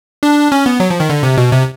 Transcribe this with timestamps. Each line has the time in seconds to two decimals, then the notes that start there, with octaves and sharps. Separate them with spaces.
0.23 D4
0.52 C#4
0.66 B3
0.80 F#3
0.90 F3
1.00 D#3
1.10 D3
1.23 C3
1.38 B2
1.52 C3